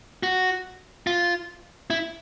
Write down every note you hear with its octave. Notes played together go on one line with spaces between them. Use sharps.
F#4
F4
E4